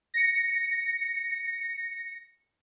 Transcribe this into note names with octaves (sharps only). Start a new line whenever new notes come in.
A#6 C#7